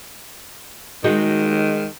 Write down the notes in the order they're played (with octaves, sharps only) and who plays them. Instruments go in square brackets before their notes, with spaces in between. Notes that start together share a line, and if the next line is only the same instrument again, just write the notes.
[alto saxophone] D#3 [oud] G#3 D#4 F#4